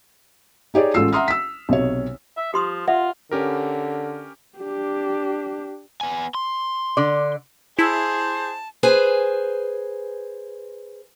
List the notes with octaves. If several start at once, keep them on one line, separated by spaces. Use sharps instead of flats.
D#4 G4 G#4 C#5 D5
A1 G#3 F4 A4 E6 C7
E5 F#5 A#5 C6 D#6 F6
E6 B6
B1 C3 C#5
E5
F3 G4 C6 D#6
F4 D5 E5 F#5
D3 C#4 G4 A#4
D4 G4
B3 G#5
C6
D3 D5
E4 G#4 C5 A5
G#4 B4 C5 G#5